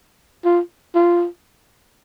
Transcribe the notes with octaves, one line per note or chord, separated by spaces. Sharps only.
F4
F4